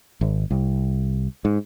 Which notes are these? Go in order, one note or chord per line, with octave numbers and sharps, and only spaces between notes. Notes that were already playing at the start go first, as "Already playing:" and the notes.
G#1
C2
G#2